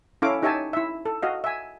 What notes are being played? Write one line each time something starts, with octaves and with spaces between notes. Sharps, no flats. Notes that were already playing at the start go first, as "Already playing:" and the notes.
C#4 E4 A4 C#5 F5 D6
D#4 G4 C#5 E5 G#5 A5
E4 E5
A4
F#4 D#5 F5
E5 G#5